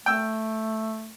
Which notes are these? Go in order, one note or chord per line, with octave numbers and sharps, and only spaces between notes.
A3 G5 E6